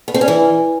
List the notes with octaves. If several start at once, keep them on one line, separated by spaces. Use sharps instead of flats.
B3
C4
C#4
E3